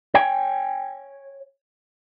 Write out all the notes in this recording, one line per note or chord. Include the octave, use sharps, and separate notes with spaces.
C#5 G5 G#5